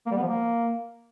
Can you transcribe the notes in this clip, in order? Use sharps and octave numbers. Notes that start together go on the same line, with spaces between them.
A#3
G3
B3
F3
A#3